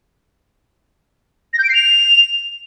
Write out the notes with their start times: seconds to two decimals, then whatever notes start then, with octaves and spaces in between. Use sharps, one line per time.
1.53 A#6
1.59 G6
1.64 D7
1.69 C7
1.74 F7